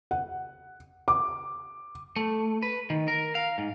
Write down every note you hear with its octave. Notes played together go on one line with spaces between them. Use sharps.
F#5
D6
A3
B4
D#3
A#4
F5
G#2